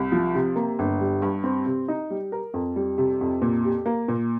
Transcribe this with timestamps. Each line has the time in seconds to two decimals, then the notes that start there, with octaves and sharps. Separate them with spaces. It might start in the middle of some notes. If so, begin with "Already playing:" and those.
Already playing: C2
0.12 F3
0.35 C3
0.56 A#3
0.79 G1
1.01 G3
1.22 G2
1.44 C4
1.66 C3
1.88 D#4
2.10 G3
2.32 A#4
2.54 F2
2.76 G3
2.98 C3
3.21 F2
3.42 A#2
3.65 G4
3.86 A#3
4.08 A#2